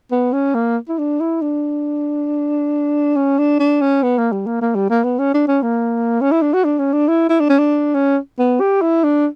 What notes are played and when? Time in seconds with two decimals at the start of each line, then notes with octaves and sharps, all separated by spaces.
0.11 B3
0.33 C#4
0.54 A#3
0.89 E4
0.98 D4
1.20 E4
1.42 D4
3.16 C#4
3.38 D4
3.59 D4
3.81 C#4
4.03 B3
4.18 A#3
4.32 G3
4.47 A#3
4.61 A#3
4.75 G3
4.90 A#3
5.04 B3
5.19 C#4
5.34 D4
5.48 C#4
5.62 A#3
6.21 C#4
6.31 E4
6.42 D4
6.54 F#4
6.64 D4
6.79 C#4
6.93 D4
7.08 E4
7.29 E4
7.40 D4
7.49 C#4
7.58 D4
7.95 C#4
8.39 B3
8.60 G4
8.82 E4
9.04 D4